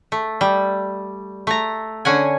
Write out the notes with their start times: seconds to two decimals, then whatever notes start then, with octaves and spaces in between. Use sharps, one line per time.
0.12 A3
0.41 G3
1.47 A3 A#5
2.05 D3 C#4 F#5 G#5